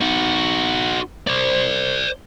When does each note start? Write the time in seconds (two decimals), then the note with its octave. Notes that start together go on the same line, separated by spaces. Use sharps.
0.01 D#4 F#4
1.27 C5 D5